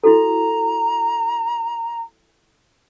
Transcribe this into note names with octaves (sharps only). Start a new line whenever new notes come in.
E4 F#4 A4 A#5